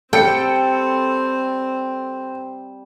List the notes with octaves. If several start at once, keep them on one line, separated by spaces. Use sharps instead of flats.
G3 C4 G4 A4 C5 G5 A5 C#7